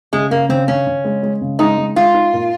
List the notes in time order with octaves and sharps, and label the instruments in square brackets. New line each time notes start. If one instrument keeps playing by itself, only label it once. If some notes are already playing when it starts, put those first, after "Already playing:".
[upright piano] C#3 [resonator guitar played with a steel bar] G#3
[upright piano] C#3 [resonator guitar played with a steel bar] A#3
[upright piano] C#3 [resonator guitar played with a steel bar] C4
[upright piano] C#3 [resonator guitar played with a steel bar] C#4
[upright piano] C#3
G#3
G#3
C#3
[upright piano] G#3 [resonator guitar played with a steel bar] D#4
[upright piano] G#3
[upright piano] G#3 [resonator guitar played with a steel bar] F4
[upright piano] D#4
A#2